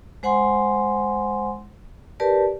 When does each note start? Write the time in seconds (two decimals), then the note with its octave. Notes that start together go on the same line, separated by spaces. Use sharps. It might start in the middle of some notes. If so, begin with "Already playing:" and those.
0.23 G#3 C5 F#5 G#5 C6
2.20 G4 A#4 B4 D5 A5